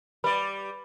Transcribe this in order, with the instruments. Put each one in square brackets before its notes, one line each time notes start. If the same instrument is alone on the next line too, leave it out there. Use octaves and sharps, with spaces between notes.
[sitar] G3 D5 [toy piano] B4 B5